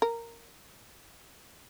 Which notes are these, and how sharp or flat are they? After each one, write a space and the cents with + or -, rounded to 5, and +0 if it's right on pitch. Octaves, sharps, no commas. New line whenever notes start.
A#4 -10